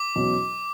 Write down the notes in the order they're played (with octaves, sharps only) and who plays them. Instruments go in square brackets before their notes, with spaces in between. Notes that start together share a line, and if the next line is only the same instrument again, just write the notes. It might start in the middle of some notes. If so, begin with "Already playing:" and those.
Already playing: [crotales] D6
[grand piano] E2 B2 F#3 C#4 F#4